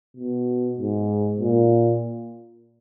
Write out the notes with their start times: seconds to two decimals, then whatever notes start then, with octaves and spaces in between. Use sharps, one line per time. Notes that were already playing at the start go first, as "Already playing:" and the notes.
0.17 B2
0.79 G#2
1.40 A#2